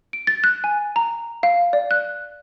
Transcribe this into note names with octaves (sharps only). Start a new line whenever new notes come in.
D7
A6
F#6
G#5
A#5
F5
D5
F#6